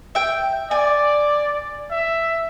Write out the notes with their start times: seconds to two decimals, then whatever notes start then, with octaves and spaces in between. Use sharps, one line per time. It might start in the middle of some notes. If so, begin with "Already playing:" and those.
0.15 E5 G5
0.71 D5 G#5
1.91 E5